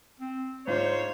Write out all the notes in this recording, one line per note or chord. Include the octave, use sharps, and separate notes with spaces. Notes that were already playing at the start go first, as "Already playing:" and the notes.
C4
G#2 D4 F4 C5 C#5